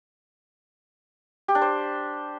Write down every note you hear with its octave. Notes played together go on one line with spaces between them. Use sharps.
G4
D4
C5